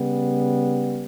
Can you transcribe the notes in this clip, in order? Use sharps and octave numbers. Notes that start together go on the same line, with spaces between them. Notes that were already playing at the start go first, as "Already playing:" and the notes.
Already playing: C#3 G3 B3